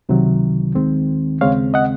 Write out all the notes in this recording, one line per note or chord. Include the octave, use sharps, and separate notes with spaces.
C#2 C3 D#3 F#3
D#2 D#3 G#3 C4
D#2 C#3 G#3 C4 C#5 F5
D#5 F#5